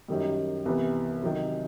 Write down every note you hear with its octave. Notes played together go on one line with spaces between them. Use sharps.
F#2 D#3 G3
C2 C3 E3 B3
C3 D#3 F#3